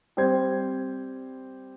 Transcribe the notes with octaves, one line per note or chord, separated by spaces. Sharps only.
G3 C4 C5 G#6